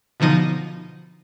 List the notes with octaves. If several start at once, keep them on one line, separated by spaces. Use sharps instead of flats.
B2 D3 F3 D#4 D#7